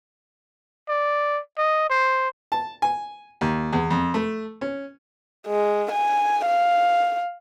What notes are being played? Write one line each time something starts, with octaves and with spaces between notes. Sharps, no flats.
D5
D#5
C5
A5
G#5
D#2
E2
F2
A3
C#4
G#3
G#5
F5